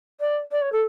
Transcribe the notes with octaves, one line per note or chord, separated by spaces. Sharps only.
D5
D5
C#5
A4